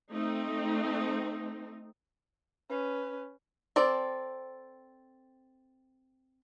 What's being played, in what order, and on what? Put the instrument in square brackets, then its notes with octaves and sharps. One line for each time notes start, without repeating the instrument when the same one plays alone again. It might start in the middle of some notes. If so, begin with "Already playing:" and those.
[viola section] A3 C4 D#4
[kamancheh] C#4 B4
[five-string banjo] C4 A4 D5